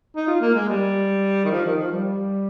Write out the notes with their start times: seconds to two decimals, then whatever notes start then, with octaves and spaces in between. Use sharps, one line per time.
0.16 D#4
0.27 F4
0.41 A#3
0.55 G#3
0.69 G3
1.45 D#3
1.51 F3
1.65 D#3
1.78 F3
1.91 G3